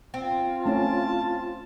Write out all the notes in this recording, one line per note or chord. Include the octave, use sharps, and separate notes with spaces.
C4 F4
A3 C#4 E4 A5